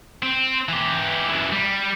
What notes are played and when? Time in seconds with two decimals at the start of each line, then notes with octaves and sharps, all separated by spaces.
0.23 C4
0.69 E3 G4
1.29 F#2 E3
1.52 G3